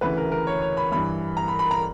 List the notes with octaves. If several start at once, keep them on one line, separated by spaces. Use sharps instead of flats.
D2 C#3 E3 B4
A#4
A#4
C#5
C#5
B5
G2 E3 B5
A#5
B5
B5
A#5